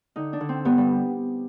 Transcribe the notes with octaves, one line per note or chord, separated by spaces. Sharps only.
D3 D#4
D4
D3
C4
G2 B3
G3